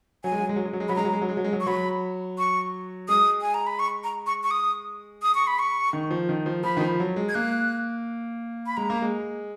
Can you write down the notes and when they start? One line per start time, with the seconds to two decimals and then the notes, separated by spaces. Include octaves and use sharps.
0.24 F#3 G#5
0.32 G#3
0.40 F#3
0.49 G#3
0.56 F#3
0.65 G#3
0.73 F#3
0.80 G#3
0.88 F#3 B5
0.96 G#3 A#5
1.05 F#3
1.13 G#3
1.21 F#3
1.29 G#3
1.37 F#3
1.44 G#3
1.53 F#3
1.60 C#6
1.67 F#3 B5
2.38 C#6
3.09 G#3 D#6
3.41 G#5
3.54 A#5
3.67 B5
3.79 C#6
4.04 A#5
4.26 C#6
4.43 C#6
4.51 D#6
5.22 D#6
5.35 C#6
5.47 B5
5.59 C#6
5.93 D#3
6.11 F3
6.29 D#3
6.46 F3
6.63 F3 B5
6.77 D#3
6.81 F3
7.00 F#3
7.16 G#3
7.29 G#6
7.34 A#3 F#6
8.66 B5
8.77 G#3 A#5
8.90 A#3
9.02 G#3